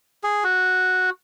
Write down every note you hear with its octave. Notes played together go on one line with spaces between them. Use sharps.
G#4
F#4